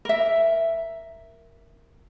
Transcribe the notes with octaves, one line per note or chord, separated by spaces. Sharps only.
A#4 E5